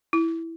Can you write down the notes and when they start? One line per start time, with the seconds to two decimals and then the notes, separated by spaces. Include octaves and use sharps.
0.13 E4